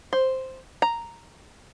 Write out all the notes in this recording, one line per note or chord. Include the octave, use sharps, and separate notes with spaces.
C5
A#5